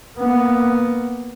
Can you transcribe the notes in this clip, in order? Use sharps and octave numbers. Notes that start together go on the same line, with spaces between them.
A#3 B3